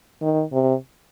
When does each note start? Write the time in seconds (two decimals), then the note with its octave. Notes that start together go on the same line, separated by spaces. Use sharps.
0.22 D#3
0.52 C3